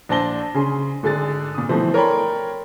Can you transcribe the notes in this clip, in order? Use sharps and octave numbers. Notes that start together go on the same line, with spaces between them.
A#1 D4 C5 A5 A#6 G7
C#3 G#4 C6
G#1 D3 G#4 A6
A#2 D#6
B2 E3 F3 A3 C4
A#4 C#5 D5 G5 B5 C6